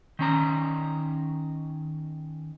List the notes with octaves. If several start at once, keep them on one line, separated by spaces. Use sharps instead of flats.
D#3 C#4 A#5